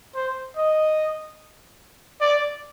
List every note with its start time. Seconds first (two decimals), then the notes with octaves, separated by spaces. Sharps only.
0.15 C5
0.57 D#5
2.21 D5